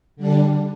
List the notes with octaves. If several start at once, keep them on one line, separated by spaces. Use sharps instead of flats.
D3 G3 D4